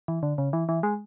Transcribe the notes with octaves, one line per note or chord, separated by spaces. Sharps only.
E3
D3
C#3
E3
E3
G#3